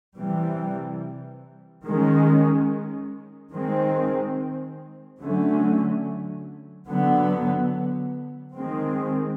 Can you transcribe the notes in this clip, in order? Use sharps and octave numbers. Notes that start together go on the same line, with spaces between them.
C3 E3 G3
D#3 G#3 C#4
D#3 G#3 C4
D3 F#3 A3 C#4
D3 F#3 B3
D#3 G#3 C4